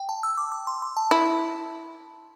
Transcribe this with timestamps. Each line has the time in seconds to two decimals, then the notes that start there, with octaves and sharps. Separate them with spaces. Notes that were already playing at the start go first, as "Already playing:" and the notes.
Already playing: G5
0.09 A5
0.23 E6
0.37 D6
0.52 D6
0.67 C6
0.82 C6
0.97 A5
1.11 E4